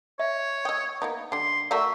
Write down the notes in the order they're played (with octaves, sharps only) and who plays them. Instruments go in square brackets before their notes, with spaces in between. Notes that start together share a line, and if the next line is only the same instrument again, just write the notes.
[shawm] C#5 [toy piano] E5
[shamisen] D#5 G5 [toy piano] D#6 E6
[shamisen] A#3 B3 D#4
[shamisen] D3 G3 [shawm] C6
[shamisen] A3 F#4 A#4 [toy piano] D5 A5 C#6 [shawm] E5